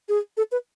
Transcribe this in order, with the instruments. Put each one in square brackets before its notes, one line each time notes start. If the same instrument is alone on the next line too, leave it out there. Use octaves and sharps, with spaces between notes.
[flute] G#4
A4
B4